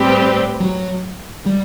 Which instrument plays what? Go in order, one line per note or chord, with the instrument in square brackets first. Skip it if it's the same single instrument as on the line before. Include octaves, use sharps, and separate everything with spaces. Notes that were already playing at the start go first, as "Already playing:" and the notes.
Already playing: [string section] A2 G3 C4 G4 B4
[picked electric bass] F#3
G3